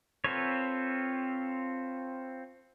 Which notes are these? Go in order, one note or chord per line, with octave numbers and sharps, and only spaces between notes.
C4 F4 A4 B4 C#5